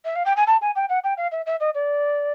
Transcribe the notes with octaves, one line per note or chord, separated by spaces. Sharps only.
E5
F5
G5
G#5
A5
G#5
G5
F#5
G5
F5
E5
E5
D#5
D5